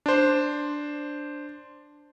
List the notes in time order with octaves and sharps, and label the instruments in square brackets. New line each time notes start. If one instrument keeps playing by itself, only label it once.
[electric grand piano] D4 C5